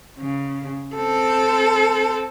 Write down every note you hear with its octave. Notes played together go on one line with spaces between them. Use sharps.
C#3
C4 A4